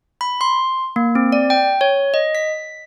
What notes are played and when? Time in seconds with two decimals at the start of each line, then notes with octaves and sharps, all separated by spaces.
0.21 B5
0.41 C6
0.96 A#3
1.15 C4
1.32 D5
1.50 G5
1.81 C#5
2.14 D#5
2.35 B6